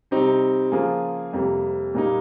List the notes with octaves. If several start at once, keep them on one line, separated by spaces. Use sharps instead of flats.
C3 G3 C4 D#4 G4
C#3 F3 A#3 F4 G#4
F2 C3 G3 A#3
A#2 G3 A#3 D#4